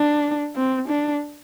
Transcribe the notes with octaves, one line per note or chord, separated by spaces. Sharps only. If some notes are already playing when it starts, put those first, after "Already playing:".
Already playing: D4
C4
D4